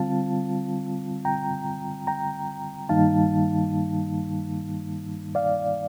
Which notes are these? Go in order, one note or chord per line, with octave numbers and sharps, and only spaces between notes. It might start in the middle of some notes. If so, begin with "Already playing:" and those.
Already playing: D3 G3 C4 F4 F5 A5
G5 A#5
G5 A#5
G2 D#3 G3 A#3 D#4 F5 A5
D5 F5